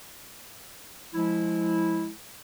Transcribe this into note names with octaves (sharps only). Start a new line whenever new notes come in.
F3 G#3 E4